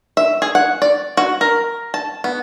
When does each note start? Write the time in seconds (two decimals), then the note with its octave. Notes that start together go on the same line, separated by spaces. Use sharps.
0.17 E5
0.42 G#4
0.55 F#5
0.82 D5
1.17 F#4
1.41 A#4
1.94 A5
2.24 B3